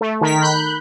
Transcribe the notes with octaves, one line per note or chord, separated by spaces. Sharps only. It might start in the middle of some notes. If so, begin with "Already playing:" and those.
A3
D#3 A#4 B6
B5 F#6 G6